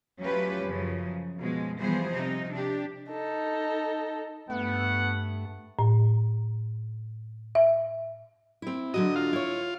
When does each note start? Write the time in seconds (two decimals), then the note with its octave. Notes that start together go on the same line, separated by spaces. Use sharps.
0.21 F#3 A3 C#4 F4 G4 B4
0.65 F#2 C#3 F3
1.38 B2 F3 G#3
1.78 E3 F3 G3 B3 G#4 C5
2.13 C3 D#4
2.53 D4 G4
3.10 D#4 A4
4.50 G2 A3 B3 F#5
5.79 A2
7.55 E5
8.62 C4 E4
8.94 D3 F#3 F#4 D#5
9.16 F4
9.33 E4 C#5